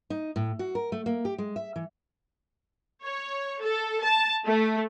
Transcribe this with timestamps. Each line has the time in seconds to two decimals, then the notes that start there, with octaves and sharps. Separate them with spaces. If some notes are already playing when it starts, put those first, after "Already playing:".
0.10 D#4
0.36 A2
0.59 F#4
0.75 A#4
0.92 A3
1.06 A#3
1.25 G4
1.38 G#3
1.56 E5
1.76 E3
3.03 C#5
3.61 A4
4.04 A5
4.46 A3